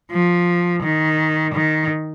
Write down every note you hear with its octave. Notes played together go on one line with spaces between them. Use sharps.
F3
D#3
D#3